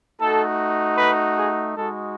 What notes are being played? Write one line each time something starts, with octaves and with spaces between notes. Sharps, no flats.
A3 D#4 F#4 A4
B4
G#4
G#3 D#4 F#4 A4